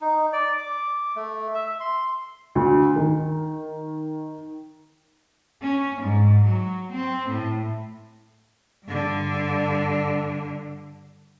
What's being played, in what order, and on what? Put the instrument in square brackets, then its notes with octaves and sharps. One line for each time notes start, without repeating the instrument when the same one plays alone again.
[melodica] D#4
D5
D6
A3
E5
C6
[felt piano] D2
D#3
[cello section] C#4
G#2
F#3
C4
A2
[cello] G2 D3